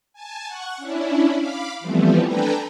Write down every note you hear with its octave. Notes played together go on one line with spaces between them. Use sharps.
G#5 A5
F#5 C#6 F#6
C#4 D4 E4
F5 B5 D6
E3 F3 G3 A3 B3 C4
D4 A4 B4 G5 G#5 A#5